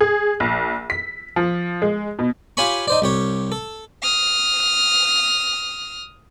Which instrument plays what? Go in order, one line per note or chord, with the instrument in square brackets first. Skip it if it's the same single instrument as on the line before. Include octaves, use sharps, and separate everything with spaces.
[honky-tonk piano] G#4
A#1
B6
F3
G#3
B2
[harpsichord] F4 G4 C#5 G#5 B5 C#6
D#4 C5 D5
C2 G4 C#5
A4
[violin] D#6 F6